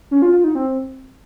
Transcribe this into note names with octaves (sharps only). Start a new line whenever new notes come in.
C#4
F4
F4
D#4
C4